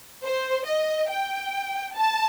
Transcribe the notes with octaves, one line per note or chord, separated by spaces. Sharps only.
C5
D#5
G5
A5